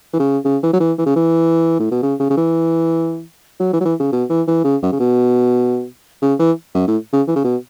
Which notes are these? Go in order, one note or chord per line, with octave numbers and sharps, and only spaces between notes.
E3
C#3
C#3
E3
F#3
E3
E3
C#3
E3
A2
B2
C#3
C#3
C#3
E3
F#3
E3
F#3
E3
C#3
B2
E3
E3
C#3
F#2
C#3
B2
C#3
E3
F#2
A2
C#3
E3
C#3
B2